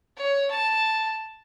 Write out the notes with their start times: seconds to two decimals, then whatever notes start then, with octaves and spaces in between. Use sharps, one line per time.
0.17 C#5
0.50 A5